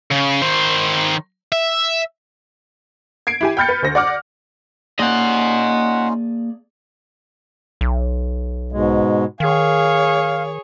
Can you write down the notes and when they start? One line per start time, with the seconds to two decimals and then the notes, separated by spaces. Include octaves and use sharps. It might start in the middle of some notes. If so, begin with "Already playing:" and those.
0.11 C#3
0.42 D#3 C5
1.52 E5
3.27 G#6 C7 D7
3.41 E4 G4 G#5
3.57 G5 B5 F6 G6 A6 C#7
3.69 B4
3.82 D2 C5 A#6
3.95 D5 F#5 D6 F6
4.99 A#3 C#4 D#4 F4 G#4 D5 D#5 F#5
7.81 B1
8.72 G#2 B2 G#3
9.40 D#3 G#4 C#5 F5